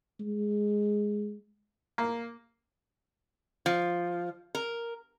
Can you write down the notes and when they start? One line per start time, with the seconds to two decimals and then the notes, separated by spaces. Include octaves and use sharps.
0.20 G#3
1.98 A#3
3.66 F3
4.55 A#4